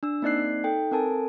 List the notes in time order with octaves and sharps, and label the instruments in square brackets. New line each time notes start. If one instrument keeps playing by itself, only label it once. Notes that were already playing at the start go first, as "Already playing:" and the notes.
[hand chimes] D4 E6
A#3 C4 D#4 D5 F#6 C7
D#4 A4 G5
C4 A4 A#4 G#5 A5